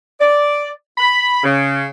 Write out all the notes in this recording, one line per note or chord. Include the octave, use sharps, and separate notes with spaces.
D5
B5
C#3